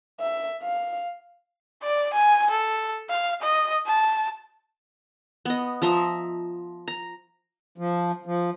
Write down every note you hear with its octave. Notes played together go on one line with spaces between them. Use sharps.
E5
F5
D5
G#5
A4
F5
D#5
A5
B3 D#5
F3 D#5 E5 A#5
A#5
F3
F3